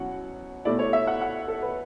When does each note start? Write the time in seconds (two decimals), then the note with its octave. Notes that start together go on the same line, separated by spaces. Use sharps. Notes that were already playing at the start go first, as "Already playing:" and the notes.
Already playing: B2 F#3 C#4 E4 F#5
0.65 B2 A3 E4 D5
0.79 C#5
0.93 E5
1.07 F#5
1.21 F#5
1.48 A4
1.62 B4